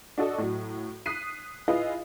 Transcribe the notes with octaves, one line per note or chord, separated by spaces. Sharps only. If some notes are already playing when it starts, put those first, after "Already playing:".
D4 F#4 A4 D#5
A2 F#3
D#6 F#6 B6 C7 D#7
E4 F4 G#4 B4 D#5 F5